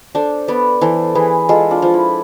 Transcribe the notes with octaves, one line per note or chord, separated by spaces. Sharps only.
D4 A4 C5
B3 B4 D5
E3 A4 C5
E3 G#4 B4
G#3 F4 A4
D4 F4
F3
E4